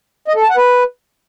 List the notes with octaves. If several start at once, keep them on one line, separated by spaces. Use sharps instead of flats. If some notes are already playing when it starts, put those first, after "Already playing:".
D#5
A4
A5
F#5
B4